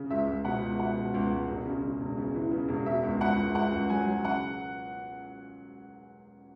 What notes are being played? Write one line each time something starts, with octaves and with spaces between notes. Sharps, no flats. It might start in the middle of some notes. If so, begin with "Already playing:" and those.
Already playing: C#3
C#2 E5
C#2
B2 F#5
C#2
B2 F#5
B2
C#2
C#2
E1
C#3
C#3
E1
C#3
E3
C#3
E1
B2 E5
C#2
C#2 F#5
C#2
C#2 F#5
C#2
F#3 G#5
F#3
C#3 F#5